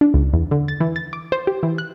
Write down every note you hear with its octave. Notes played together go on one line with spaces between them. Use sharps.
D4
C#2
E2
D3
A6
E3
A6
D6
C5
G4
E3
F#6